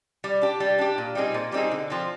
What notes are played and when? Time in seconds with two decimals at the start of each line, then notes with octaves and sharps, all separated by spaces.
0.24 G3
0.42 D4 G4
0.60 G3
0.78 D4 G4
0.98 A#2
1.15 G3 C4 D#4 G#4
1.34 A#2
1.52 G3 C4 D#4 G#4
1.71 D3
1.90 F3 C4